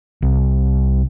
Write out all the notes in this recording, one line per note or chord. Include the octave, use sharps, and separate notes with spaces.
C2